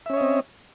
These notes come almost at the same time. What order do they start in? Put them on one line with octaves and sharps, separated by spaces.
E5 C#4 C#5 D#5 C4